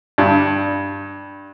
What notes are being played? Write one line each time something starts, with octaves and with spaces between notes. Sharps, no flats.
G2